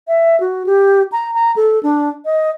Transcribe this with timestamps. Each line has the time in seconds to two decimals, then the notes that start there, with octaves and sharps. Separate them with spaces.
0.08 E5
0.40 F#4
0.66 G4
1.12 A#5
1.34 A#5
1.56 A4
1.83 D4
2.25 D#5